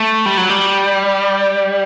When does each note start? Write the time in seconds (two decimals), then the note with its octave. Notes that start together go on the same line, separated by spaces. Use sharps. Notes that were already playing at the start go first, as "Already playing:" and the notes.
Already playing: A3
0.26 G3
0.37 F#3
0.49 G3